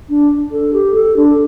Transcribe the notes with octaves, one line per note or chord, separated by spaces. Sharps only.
D4
A4
G4
A4
D4